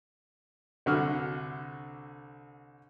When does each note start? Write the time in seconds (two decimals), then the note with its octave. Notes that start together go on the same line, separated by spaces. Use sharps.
0.86 C2 D3 F#4 F6